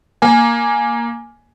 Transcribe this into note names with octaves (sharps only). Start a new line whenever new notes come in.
A#3 G#5